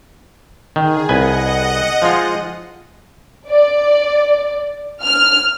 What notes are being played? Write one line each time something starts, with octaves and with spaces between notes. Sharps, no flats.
D#3 G#4
C2 B4 D#5 F#5 G#5
F3 G#3 F4
D5
F6